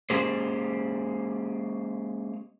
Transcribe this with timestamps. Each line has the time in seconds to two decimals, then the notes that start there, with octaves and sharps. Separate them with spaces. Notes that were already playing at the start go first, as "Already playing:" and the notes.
0.10 G#3 A#3 C#4 G4 G#4 C5